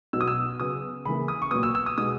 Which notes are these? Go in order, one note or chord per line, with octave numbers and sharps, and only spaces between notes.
B2 F#3 B3 E6
D#6
E6
C#3 F#3 B3 D#6
C#3 E3 A#3 B5
D#6
C#6
A#2 F#3 B3 D#6
E6
E6
D#6
B2 G#3 B3 D#6